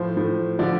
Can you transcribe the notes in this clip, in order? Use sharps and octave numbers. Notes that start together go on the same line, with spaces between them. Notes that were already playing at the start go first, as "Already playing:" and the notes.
Already playing: A2 F3 C5
A2 F3
D3 F3 D5